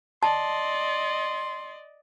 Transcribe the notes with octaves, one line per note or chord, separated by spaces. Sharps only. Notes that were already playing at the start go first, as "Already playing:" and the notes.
D5 D#5 A5 C6